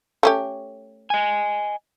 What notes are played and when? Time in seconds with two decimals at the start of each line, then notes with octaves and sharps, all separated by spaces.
0.23 A3 C#4 G4
1.10 D#5 G#5